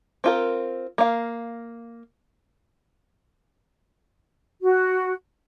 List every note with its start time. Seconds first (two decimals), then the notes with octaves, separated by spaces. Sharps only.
0.24 C4 F4 A#4
0.98 A#3 F5
4.62 F#4